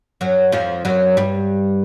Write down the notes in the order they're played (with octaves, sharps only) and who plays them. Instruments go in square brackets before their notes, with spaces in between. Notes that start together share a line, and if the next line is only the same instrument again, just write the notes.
[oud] F#2 F#3
F2 F3
F#2 F#3
G2 G3